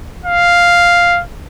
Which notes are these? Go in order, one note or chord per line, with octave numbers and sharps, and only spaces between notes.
F5